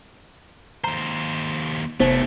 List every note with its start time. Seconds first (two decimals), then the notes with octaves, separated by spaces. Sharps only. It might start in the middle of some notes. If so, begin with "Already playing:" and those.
0.84 D#2 C5 A#5
2.00 F1 C3 A3 B3 D#4 C5